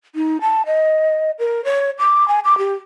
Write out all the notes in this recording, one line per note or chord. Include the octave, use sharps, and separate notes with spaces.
D#4
A5
D#5
A#4
C#5
D6
G#5
D6
G4